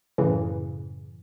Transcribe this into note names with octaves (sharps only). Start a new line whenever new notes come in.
F#2 A2 C#3 E3